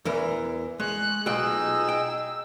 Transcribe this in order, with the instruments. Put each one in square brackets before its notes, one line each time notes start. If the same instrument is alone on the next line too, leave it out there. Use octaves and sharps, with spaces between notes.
[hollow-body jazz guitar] E2 E3 A#4
[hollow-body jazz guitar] G#3 [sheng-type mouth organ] C#6 [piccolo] F#6
[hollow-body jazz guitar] B1 F4 G5 [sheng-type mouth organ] D#4 G#4 D#5 [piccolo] E6
[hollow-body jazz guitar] G5